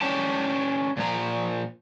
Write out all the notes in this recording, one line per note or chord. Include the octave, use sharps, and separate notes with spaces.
C#4 D4 G4 A5
A#2 F3 A#5